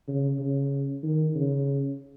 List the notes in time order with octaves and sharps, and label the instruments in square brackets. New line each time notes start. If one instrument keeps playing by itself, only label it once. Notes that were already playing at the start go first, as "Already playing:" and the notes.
[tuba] C#3
C#3
D#3
C#3